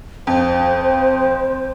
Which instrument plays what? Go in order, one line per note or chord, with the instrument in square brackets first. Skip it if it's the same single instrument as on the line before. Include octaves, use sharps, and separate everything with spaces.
[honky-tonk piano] F2 [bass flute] C5